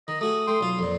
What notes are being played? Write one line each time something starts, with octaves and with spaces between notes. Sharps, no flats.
D#3 D#5
A3 F#4 G#4 D#6
A3 G5 C6
B1 F4
F2 A#2